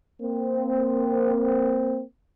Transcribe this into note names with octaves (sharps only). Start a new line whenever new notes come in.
A#3 C4